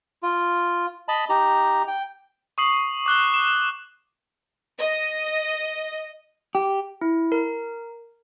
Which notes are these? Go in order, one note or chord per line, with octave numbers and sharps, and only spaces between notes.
F4
D#5 A5 B5
D#4 G4 A#5
G5
C#6 D#6 C7 F#7
D6 F#6 G7
E7
D#5
G4
E4
A#4